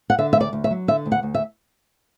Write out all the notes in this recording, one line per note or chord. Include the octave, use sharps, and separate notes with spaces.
F#5
D3 E5
E5
D2 D5
D2
E5
F#3
D3 E5
D2
F#5
D2
E5